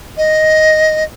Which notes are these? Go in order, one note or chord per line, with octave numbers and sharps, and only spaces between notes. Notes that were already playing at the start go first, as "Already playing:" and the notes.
D#5